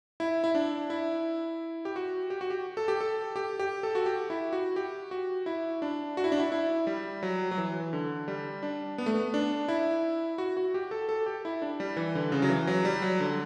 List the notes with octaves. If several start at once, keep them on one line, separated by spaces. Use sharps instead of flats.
E4
E4
D4
E4
G4
F#4
G4
F#4
G4
A4
G4
A4
G4
G4
A4
F#4
G4
E4
F#4
G4
F#4
E4
D4
F#4
E4
D4
E4
E4
G3
F#3
F#3
E3
D3
G3
D4
B3
A3
B3
D4
E4
F#4
F#4
G4
A4
A4
G4
E4
D4
G3
E3
D3
C#3
F#3
E3
F#3
G3
F#3
D3